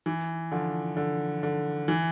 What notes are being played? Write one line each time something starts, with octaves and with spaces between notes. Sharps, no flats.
E3
D3 F3
D3
D3
E3